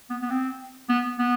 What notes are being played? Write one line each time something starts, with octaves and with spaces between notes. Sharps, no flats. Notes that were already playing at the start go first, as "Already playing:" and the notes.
B3
B3
C4
B3
B3